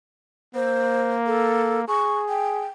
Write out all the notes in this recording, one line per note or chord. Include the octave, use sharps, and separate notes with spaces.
A#3 C5
A4
G#4 C#6
G5